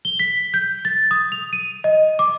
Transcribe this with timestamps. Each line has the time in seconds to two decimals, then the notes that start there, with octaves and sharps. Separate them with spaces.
0.05 G7
0.19 B6
0.54 G6
0.85 A6
1.11 D#6
1.32 F7
1.53 D#7
1.84 D#5
2.19 D6